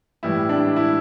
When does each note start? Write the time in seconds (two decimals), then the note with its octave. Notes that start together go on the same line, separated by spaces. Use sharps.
0.23 A2 E3 G3 E4
0.49 D4
0.76 E4